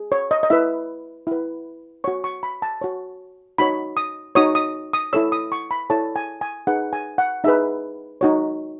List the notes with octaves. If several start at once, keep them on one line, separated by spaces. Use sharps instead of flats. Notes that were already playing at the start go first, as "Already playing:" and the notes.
Already playing: G#4
C#5
D#5
D#5
E4 B4 E5
E4 B4
F#4 C#5 C#6
C#6
B5
A5
F#4 C#5
D#4 F#4 C#5 B5
D#6
D#4 F#4 C#5 D#6
D#6
D#6
E4 A4 C#5 E6
D#6
C#6
B5
E4 A4 C#5 A5
G#5
G#5
D#4 G#4 B4 F#5
G#5
F#5
D#4 G#4 B4 E5
D#4 F#4 C#5